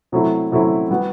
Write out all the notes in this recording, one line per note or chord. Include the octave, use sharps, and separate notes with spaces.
C3 F#3 A3 C4 E4
C3 F#3 A3 C4 E4
G3 B3 F#4